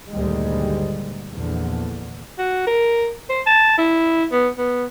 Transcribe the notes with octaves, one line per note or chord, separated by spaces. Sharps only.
D2 G2 A#2 D#3 G3 G#3
A#1 E2 D3
F#4
A#4
C5
A5
E4
B3
B3